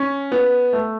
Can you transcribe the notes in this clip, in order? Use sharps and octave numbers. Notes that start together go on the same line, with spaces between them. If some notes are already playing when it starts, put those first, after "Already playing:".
Already playing: C#4
B3
A3